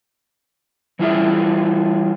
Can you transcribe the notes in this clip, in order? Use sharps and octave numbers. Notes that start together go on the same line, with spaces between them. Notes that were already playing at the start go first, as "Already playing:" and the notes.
E3 G3 E4 F4 G#4 E5